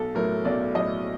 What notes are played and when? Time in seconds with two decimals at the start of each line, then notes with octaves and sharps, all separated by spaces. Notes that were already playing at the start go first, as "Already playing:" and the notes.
Already playing: B1 A4
0.15 A2 F#3 A#4
0.45 B1 D5
0.75 A2 F#3 D#5